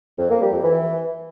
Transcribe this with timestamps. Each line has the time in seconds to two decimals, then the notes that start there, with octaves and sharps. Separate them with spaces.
0.19 F2
0.30 A#3
0.41 G3
0.52 F2
0.63 E3